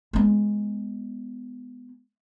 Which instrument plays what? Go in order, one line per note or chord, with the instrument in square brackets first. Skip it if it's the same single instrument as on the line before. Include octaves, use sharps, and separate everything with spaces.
[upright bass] G#3 B3